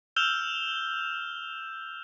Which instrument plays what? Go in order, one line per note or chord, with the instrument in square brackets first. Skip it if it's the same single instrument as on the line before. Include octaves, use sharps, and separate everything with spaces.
[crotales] E6 F6 G6 E7 F7 G7